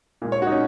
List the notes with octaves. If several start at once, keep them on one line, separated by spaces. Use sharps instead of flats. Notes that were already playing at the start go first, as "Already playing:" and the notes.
A#2 G#3
C#5
F#4
D#4
C#4